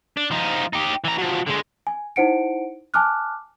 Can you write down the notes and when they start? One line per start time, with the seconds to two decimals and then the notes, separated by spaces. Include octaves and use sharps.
0.17 D4
0.31 F3 D#4
0.73 D#4 G4
1.04 E3 A#5
1.18 F3 F#3
1.47 D3 G#3
1.87 G#5
2.16 D#4 E4 C5 F#5 C#7 D7
2.94 G#5 A5 D6 F6 F#6